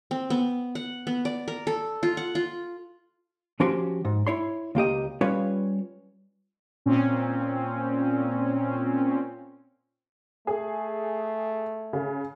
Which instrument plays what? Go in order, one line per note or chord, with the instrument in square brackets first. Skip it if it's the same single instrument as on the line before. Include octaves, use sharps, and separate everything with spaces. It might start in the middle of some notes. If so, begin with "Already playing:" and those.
[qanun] C4
B3
F#5
B3
D5
A#4
A4
F4
F#5
F4
[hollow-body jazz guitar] F3 C#4 F#4 G4 C6
G#2
E4 C#5 C6
C#2 A#3 G4 D#5
G3 C#4 F4 B4 C#5
[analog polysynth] A#2 C4 C#4
[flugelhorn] A3 [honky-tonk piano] G#4
[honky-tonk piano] C#3